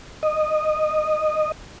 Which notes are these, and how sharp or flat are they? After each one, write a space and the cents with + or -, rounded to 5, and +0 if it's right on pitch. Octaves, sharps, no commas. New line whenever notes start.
D#5 -15